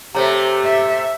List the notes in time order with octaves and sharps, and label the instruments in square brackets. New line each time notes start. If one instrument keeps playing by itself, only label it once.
[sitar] C3 A3 [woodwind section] G4 [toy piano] C5 C#5 A#5
[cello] E5